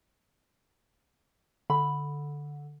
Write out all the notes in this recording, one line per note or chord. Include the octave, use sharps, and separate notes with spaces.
D3 B5